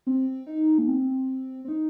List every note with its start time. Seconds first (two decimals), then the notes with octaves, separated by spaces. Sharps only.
0.07 C4
0.47 D#4
0.78 A#3
0.88 C4
1.65 C4
1.68 D#4